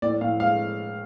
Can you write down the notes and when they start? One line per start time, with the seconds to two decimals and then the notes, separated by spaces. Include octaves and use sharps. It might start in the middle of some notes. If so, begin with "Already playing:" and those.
0.02 A2 D5
0.21 A2 F5
0.40 G#3 F5